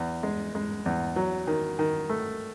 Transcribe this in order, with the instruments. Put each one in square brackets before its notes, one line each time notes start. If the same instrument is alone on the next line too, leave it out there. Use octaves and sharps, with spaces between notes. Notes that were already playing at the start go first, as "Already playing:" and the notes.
Already playing: [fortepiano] E2
G#3
G#3
E2
F#3
D#3
D#3
A3